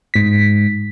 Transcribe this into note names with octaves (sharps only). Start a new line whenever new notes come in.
G#2 B6